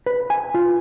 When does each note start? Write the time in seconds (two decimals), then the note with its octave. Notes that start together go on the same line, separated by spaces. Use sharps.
0.06 B4
0.30 G#5
0.54 F4